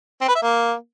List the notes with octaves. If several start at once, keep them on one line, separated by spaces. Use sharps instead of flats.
C4
B4
E5
A#3